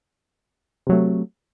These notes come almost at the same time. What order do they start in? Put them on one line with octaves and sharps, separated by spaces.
C3 F#3 A3